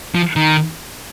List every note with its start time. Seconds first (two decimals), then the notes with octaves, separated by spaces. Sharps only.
0.15 F3
0.36 D#3